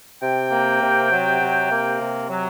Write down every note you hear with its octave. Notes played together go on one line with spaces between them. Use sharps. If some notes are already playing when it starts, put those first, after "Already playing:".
C3 G5
A#3
C3
F#3
C3
A#3
C3
F#3